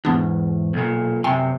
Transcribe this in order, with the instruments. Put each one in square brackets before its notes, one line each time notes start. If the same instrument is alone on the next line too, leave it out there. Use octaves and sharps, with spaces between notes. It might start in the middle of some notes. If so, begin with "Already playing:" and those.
[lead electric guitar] E2 G#2 [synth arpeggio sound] B3 D4
[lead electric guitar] B1 A#2
[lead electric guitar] F#2 C3 [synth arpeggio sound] G5 G#5 C6